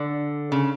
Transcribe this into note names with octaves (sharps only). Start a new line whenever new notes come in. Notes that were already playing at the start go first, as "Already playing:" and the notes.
Already playing: D3
C#3